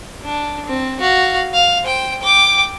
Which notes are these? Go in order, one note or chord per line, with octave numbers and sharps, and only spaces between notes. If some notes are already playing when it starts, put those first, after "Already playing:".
D4
C4
F#4 F5
F5
C5 G5
G5 D6